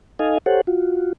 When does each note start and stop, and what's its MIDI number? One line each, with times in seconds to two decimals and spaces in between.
0.19 0.38 63
0.19 0.38 69
0.19 0.38 75
0.19 0.38 77
0.19 0.38 80
0.46 0.61 67
0.46 0.61 69
0.46 0.61 72
0.46 0.61 73
0.46 0.61 78
0.67 1.13 65
0.67 1.13 66